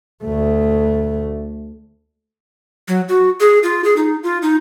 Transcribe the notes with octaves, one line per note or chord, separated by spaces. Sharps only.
D2 A3
F#3
F#4
G#4
F4
G#4
D#4
F4
D#4